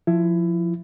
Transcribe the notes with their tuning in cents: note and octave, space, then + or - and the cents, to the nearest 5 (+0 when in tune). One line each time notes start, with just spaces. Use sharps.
F3 +5 E4 +20